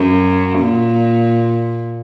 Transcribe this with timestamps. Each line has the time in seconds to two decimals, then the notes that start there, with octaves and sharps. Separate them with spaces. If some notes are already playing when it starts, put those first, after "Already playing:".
Already playing: F#2
0.59 A#2